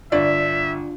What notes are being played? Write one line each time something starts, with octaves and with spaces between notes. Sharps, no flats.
G1 D4 F4 D5 E5